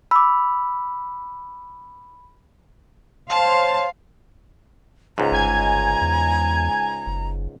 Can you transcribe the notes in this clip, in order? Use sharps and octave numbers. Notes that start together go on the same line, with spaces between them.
B5 D6 E6
C5 C#5 F5 A5 C6
C#2 G#2 A#5
G1 G#5 G#6
E2
F#1